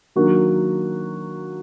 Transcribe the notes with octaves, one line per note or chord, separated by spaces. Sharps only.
D#3 F#3 A#3 D4 F#4